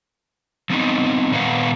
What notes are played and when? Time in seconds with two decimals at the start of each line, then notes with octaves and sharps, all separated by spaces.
0.70 F3 B3 C4 D#4
1.31 A#2 D#3 B3 B4 F5 F#5